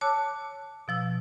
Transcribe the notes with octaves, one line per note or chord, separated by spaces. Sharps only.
C#5 A5 D6 E6 F#6
B2 F3 E6